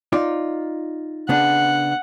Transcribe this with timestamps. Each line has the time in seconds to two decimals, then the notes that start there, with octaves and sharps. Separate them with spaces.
0.12 D#4 F4 D5
1.29 C#3 B3 D4 F#5